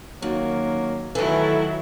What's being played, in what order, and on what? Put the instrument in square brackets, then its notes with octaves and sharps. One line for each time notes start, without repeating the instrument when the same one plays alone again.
[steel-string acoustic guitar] F#2 [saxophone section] D#3 F#3 A#3
[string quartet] D#3 F#3 E4 [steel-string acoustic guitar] E3 A3 [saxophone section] A4